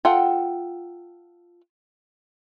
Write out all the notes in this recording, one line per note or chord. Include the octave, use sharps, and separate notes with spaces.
F4 A4 F#5 G5